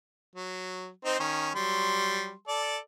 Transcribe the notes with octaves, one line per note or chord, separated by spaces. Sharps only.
F#3
C4 D#4 C5
D#3 C#4
F#3 G3 C6
A4 D5